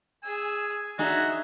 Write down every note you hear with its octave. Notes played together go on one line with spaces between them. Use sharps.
G#4 G#5 E6
D4 D#4 F#4 G#4 E5